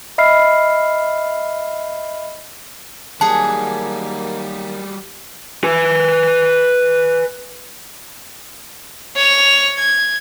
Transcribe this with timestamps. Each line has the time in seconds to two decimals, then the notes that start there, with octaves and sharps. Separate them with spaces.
0.18 D#5 E5 B5 F6 C7
3.21 D#3 F#3 G3 A#3 F#4 G#4 F#5 A5
5.64 B4 G#5
9.16 C#5 F7
9.78 G#6